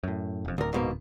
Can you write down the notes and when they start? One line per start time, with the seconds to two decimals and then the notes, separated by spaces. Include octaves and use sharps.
0.03 F#2 A2
0.45 E1 F2
0.58 D1 D2 A#4
0.73 G#2 B2 A#3